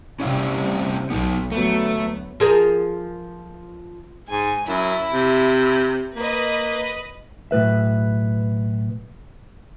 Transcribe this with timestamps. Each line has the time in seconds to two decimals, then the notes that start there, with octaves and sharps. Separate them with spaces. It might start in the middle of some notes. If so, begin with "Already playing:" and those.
0.20 C3 G3 C#4 E4 F5
1.10 B1 B3 D#4
1.52 D2 F#3 A3 B3
2.40 F3 G#4 A#4
4.29 G#2 G#5
4.67 F#2 E4
5.10 C3
6.16 A#3 B4 D#5
7.51 B1 A2 B4 E5